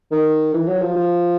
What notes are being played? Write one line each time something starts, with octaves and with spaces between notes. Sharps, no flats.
D#3
E3
F#3
F3
F3